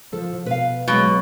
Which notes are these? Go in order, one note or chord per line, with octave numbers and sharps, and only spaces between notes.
F3 A4
B2 B4 F5
B2 F#3 G#3